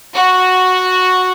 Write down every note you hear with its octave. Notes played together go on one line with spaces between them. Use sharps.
F#4